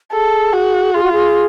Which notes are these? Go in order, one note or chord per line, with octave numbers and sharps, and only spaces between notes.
G#4 A4
F#4
F4 G#4
F#4
G#4